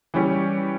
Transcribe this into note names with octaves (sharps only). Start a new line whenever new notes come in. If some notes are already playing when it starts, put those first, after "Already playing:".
E3 G3 C#4 G4